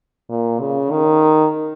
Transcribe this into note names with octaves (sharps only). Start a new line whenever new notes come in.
A#2
C#3
D#3